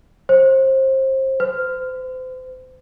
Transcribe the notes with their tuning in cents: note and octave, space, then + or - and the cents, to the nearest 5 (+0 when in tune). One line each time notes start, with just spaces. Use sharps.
C5 +25
C5 -35